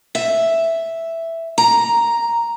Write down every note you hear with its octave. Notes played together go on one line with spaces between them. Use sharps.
E5
A#5